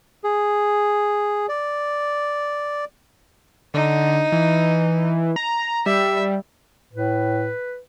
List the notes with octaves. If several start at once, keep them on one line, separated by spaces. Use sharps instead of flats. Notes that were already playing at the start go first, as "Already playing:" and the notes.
G#4
D5
D3 D#4
E3
A#5
G3 E5
A2 B4